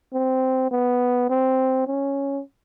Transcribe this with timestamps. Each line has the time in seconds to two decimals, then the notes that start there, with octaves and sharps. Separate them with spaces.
0.13 C4
0.71 B3
1.29 C4
1.87 C#4